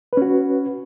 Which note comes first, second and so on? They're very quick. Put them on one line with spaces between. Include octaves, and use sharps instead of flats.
B4 C#4 F#4